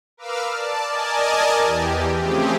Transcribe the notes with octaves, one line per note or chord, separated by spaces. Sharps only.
A#4 B4 F5 D6 E6 F6
D5 A5
A#4 D5 D#5 G#5 A5
E2 E3 G4
C#3 F3 A3 C4 G4 G#4